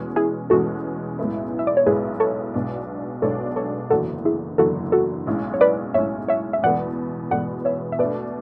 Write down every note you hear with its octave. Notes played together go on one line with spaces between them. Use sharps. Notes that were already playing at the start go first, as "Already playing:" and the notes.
Already playing: E2 B2 G#3 C#4
E4 G#4
E2 B2 G#3 C#4 F#4 A4
B1 A2 G#3 B3 E4
E5
D5
C#5
B1 A2 G#3 B3 E4 G#4 B4
A4 C#5
B1 B2 G#3 D4
B1 B2 G#3 D4 A4 C#5
A4 C#5
F#1 E2 D3 F#3 F#4 A4
E4 G#4
F#1 E2 D3 F#3 F#4 A4
F#4 A4
B1 A2 G#3 C#4
C#5
B4 D5
B1 A2 G#3 C#4 C#5 E5
C#5 E5
E5
E2 B2 G#3 B3 D5 F#5
E2 B2 G#3 B3 D5 F#5
C#5 E5
E5
B2 A3 D4 B4 D5